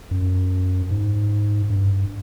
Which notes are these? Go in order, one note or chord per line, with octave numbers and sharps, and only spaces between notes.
F#2
G#2
G2